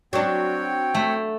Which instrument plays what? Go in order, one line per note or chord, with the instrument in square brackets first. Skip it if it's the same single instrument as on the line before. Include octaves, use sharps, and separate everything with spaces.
[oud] F#3 D4 [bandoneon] C4 C#5 G5
[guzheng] A3